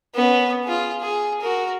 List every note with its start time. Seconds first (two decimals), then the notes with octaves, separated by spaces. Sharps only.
0.15 B3 C#4
0.65 F4 G#4
1.01 G#4
1.41 F#4 A#4